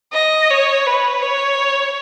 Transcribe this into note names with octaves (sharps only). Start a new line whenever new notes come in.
D#5
C#5
B4
C#5